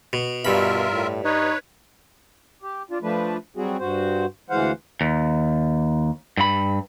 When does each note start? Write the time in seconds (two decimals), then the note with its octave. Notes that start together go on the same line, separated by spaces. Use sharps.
0.13 B2
0.45 G2 B2 F4 A#4 E5 B5
0.92 A2
1.24 D#4 B4 C#5
2.62 G4
2.91 D4 F4
3.02 F3 A3 D4 B4
3.57 F#3 G3 C4 F#4 G#4
3.80 G2 F#4 C5
4.50 D2 E3 G#3 C5 F5 F#5
5.01 D#2
6.37 G2 B5